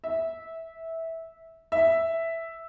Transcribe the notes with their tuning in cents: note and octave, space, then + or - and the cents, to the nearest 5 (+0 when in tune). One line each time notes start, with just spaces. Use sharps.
E5 -15
E5 +0